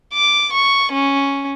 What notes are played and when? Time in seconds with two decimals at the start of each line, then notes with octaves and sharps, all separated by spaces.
0.13 D6
0.53 C#6
0.92 C#4